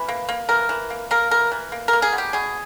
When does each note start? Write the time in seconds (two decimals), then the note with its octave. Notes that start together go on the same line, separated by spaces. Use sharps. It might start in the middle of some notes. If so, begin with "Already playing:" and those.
Already playing: E3 B4
0.08 A#3
0.29 A#3
0.49 E3 A#4
0.69 E3
0.90 A#3
1.11 A#3 A#4
1.31 E3 A#4
1.52 E3
1.72 A#3
1.88 A#4
1.93 A#3
2.02 G#4
2.13 B2
2.18 G4
2.33 B2 G#4